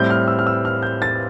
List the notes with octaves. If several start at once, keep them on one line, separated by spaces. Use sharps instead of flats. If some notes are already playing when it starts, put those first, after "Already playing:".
Already playing: A2 G3 C4 G6
F6
E6
F6
E6
F6
G6
A6